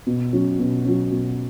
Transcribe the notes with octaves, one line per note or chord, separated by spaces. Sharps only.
B2
F#3 C#4
B2
F#3 C#4
B2